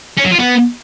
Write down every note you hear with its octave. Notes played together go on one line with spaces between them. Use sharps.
C#4
F#3
F4
B3